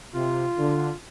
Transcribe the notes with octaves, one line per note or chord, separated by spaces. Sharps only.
C3 F4
D3